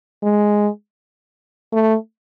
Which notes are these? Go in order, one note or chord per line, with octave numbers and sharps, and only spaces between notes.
G#3
A3